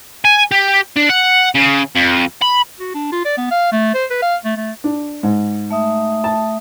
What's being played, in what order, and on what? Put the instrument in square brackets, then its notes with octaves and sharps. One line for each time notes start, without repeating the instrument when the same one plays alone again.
[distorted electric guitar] G#5
G4
D4
F#5
C#3
F2
B5
[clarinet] F#4
D4
F4
D5
B3
F5
A3
C5
B4
F5
A3
A3
[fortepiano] D4
G#2
[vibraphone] A3 E5 D#6
[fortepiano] A5